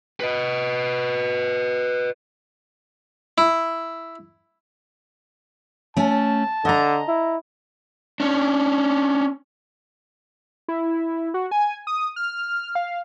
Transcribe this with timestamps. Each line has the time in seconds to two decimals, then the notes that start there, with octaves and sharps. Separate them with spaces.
0.20 B4 D#5
3.38 E4
5.97 A3 C#4 A5
6.65 D3 D#5 A#5
7.08 E4
8.20 C#4 D4
10.68 E4
11.34 F#4
11.51 G#5
11.87 D#6
12.16 F6
12.75 F5